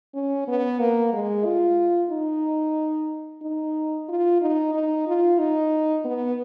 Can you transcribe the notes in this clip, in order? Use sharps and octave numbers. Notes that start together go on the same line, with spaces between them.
C#4
B3
A#3
G#3
F4
D#4
D#4
F4
D#4
D#4
F4
D#4
B3